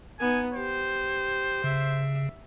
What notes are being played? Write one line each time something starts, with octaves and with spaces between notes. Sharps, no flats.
B3 D#4 G#5
G4 C5
C#3 E5